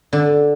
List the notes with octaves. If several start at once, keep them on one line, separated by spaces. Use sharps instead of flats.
D3